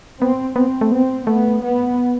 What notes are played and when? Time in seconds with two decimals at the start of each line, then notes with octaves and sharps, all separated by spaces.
0.21 B3 C4
0.56 B3 C4
0.81 A3
0.91 B3 C4
1.27 A3 B3
1.63 B3